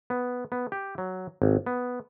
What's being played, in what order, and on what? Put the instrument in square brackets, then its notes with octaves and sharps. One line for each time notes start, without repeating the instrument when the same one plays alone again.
[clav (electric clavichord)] B3
B3
G4
F#3
G#1
B3